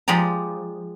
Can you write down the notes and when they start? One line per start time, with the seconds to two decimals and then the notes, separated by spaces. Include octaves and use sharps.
0.08 F3 G#3 G4 D5 A#5